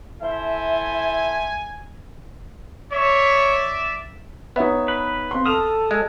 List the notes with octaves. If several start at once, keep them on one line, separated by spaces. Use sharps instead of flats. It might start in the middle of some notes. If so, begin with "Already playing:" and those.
E4 A4 C5 E5 G#5
C#5 D5 E5
B3 D#4 C#5 E5
B4
C4 F5 C6
A4 D#6 F6 E7 F7
G#3